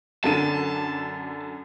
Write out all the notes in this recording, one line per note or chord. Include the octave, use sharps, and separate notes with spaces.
F#2 D3 A5 D#7